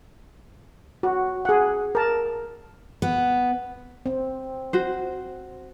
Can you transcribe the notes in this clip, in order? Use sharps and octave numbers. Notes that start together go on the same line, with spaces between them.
F#4
G#4 F#5
A#4 A5
B3
C4
F#4 C5